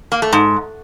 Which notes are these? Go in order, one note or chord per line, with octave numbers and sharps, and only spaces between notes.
A#3
A3
G#2